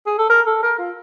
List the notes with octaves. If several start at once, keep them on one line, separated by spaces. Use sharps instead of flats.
G#4
A4
A#4
A4
A#4
F4